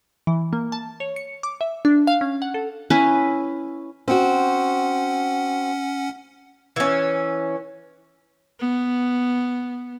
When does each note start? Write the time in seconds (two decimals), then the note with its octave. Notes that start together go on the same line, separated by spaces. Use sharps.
0.27 E3
0.53 A#3
0.72 A5
1.00 C#5
1.16 C#7
1.43 D6
1.61 E5
1.85 D4
2.07 F5
2.21 C#4
2.42 F#5
2.54 A4
2.90 C#4 E4 B4 G#5
4.08 C4 C#4 F#4 F#5
6.76 E3 C#4
8.60 B3